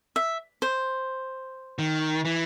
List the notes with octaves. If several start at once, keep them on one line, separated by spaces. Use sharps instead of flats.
E5
C5
D#3
E3